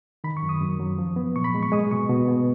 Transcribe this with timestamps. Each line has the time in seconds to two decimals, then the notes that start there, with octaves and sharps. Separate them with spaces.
0.24 D#3 B5
0.37 C#6
0.43 F#2
0.49 D#6
0.61 F#2
0.80 F#3
0.98 F3
1.16 B3
1.36 A#2 C#6
1.44 B5
1.54 G#3
1.63 C#6
1.72 G#3 D#6
1.91 B2 C#6
2.09 B2
2.28 B3